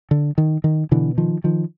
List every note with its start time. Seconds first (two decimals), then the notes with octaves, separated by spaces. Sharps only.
0.11 D3
0.38 D#3
0.64 D#3
0.91 B2 D3 E3
1.18 D#3 F3
1.44 D#3 F3